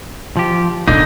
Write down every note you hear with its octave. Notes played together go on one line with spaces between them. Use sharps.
F3 G4
D1 B1 D3 F#3 A#3 D#4